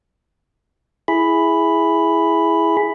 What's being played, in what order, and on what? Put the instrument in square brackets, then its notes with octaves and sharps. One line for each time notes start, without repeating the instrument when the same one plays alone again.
[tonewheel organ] E4 G#4 B5